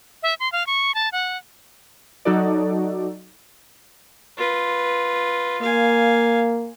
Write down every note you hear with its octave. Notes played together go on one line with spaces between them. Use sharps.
E5
C6
F5
C#6
A5
F#5
F#3 D#4 F#4 A4 D5
F4 B4
A#3 F5 G#5